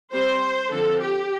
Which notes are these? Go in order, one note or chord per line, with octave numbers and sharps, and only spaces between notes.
G3 C4 C5
D3 F3 C4 A4
G4